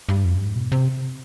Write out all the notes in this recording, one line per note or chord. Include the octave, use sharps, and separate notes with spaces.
G2
F2
G2
G#2
B2
C3